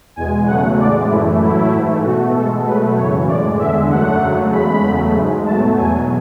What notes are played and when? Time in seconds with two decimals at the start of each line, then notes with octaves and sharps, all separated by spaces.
0.16 E2 B2 G#3 G#5
0.47 E2 C#3 F#3 A3 F#5
0.78 A2 G#3 D5
1.09 F#2 E3 A3 E4
1.41 A2 F#3 A3 E4
1.71 G#2 E3 A3
2.03 B2 A3 F#4
2.34 B2 G#3 A4
2.65 B2 F#3 A3 B4
2.96 F#2 C#3 E3 C#5
3.27 A2 G#3 D5
3.59 E2 D3 G#3 E5
3.90 F#2 D3 F#3 A3 F#5
4.21 F#2 C#3 F#3 A3
4.52 E2 C#3 G#3 B5
4.83 E2 C#3 F#3 A3
5.15 G#2 G#3
5.45 B2 F#3 A3 A5
5.77 E2 B2 F#3 G#5